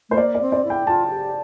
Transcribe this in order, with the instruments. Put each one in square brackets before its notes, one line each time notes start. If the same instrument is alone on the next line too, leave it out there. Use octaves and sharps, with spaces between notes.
[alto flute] A3 [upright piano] C5
[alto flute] A#3 [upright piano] D5
[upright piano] D5
[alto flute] C4
[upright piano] D5
[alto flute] E4
[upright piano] G5
[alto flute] F4 [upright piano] A5
[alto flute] F4
G4